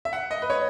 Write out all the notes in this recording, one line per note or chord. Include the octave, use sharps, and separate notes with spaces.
E5
F#5
D#5
B4
C#5